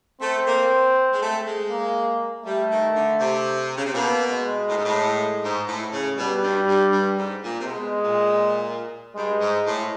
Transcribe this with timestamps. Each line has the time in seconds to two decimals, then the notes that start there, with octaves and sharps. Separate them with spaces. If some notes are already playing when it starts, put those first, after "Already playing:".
0.21 A3 C4
0.46 A#3
1.12 G#3
1.21 A3
1.45 G#3
1.70 A#3
2.44 G3 A3
2.70 D#3
2.95 D3
3.19 C3
3.76 C#3
3.85 C3
3.94 B2 A#3
4.31 G#3
4.68 A2
4.76 G#2
4.84 A2
5.43 G#2
5.68 A2
5.92 C#3
6.17 B2 G3
6.43 G2
6.67 G2
6.92 G2
7.17 G#2
7.42 A#2
7.60 C3
7.66 B2 G#3
8.04 A#2
9.16 G2 G#3
9.41 G#2
9.66 A2